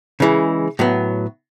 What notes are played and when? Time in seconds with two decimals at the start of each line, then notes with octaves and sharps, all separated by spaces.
0.20 C#3 E3 G#3
0.79 A2 F#3 B3